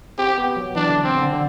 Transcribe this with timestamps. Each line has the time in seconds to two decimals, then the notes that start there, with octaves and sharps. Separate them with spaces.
0.18 C4 G4
0.38 B3
0.56 F#3
0.75 E3 D4
0.90 D3
1.04 C4
1.18 D3
1.33 D3